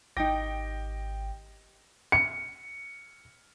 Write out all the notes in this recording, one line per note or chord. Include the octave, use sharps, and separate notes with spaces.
G#1 D#4 G4 G5 A#6
C#7